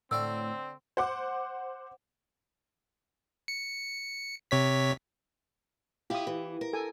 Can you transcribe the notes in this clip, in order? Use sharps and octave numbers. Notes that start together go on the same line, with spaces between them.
A2 D3 C4 D5 G5 C#6 E6
C5 F#5 D6
C#7
C3 C#5 B6
E4 F4 G4 D#6
E3 G4
A#4
A4 G#5